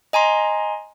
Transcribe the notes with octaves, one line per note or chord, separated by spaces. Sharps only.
D#5 G#5 A#5 C6